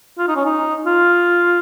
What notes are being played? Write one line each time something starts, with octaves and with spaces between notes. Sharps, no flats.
F4
D#4
C#4
D#4
F4